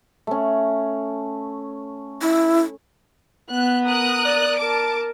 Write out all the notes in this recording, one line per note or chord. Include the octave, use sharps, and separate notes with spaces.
A3 C#4
E4
B3 F#6
A#4 D#6 F#6
D5
A#4 A5 D6 D7